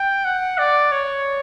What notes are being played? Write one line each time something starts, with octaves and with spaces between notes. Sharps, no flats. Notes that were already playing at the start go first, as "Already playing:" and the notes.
Already playing: G5
F#5
D5
C#5